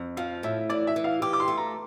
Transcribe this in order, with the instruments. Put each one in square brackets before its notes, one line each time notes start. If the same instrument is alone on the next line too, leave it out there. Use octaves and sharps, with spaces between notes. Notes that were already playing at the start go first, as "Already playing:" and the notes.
Already playing: [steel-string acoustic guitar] F2
[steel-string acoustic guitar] F3 [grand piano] F5
[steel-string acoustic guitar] A2 [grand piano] E5
[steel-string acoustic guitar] E3 [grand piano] D5
[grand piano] E5
[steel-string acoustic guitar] E3
[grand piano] F5
[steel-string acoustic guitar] G4 [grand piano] D6
[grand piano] D6
C6
[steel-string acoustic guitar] A3
[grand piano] A#5